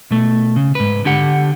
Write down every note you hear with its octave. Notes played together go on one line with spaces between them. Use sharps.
B2 A3
C#3
G#2 B4
D3 G4 F#5